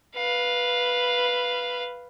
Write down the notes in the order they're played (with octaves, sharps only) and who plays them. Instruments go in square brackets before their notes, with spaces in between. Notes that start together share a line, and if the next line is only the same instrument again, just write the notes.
[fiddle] B4 F5